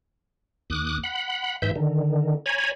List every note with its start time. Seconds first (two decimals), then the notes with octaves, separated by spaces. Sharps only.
0.70 D#2 D6 D#6 F#6
1.03 F#5 B5
1.62 G#2 E3 E5 G6
1.76 D3 D#3
2.46 C#5 G#5 A#5 B5